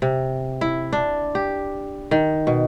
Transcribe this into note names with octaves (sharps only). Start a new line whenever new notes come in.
C3
E4
D4
G4
D#3
B2